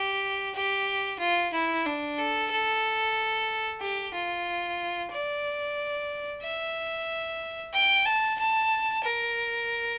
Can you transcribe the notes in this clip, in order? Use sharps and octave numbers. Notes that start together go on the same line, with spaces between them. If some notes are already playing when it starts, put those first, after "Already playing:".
Already playing: G4
G4
F4
E4
D4
A4
A4
G4
F4
D5
E5
G5
A5
A5
A#4